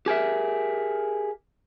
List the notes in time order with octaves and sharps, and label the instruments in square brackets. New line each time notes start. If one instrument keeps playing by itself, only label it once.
[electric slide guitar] G4 G#4 A#4 E5